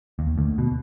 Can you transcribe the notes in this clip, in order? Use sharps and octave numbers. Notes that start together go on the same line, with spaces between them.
D#2
D2
B2